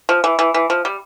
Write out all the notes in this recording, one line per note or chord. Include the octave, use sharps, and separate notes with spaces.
F3
E3
E3
E3
F3
G3